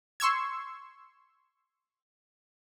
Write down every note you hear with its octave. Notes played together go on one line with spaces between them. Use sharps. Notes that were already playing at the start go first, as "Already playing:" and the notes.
C6 C#6 E6 G#6